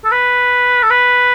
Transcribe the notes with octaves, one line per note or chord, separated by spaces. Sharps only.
A4
B4
A4
B4